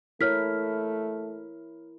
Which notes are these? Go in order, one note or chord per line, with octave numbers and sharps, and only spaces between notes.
A3 E4 A#4 C#5 F6 B6